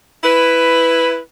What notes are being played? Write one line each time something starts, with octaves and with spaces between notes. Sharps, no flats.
E4 B4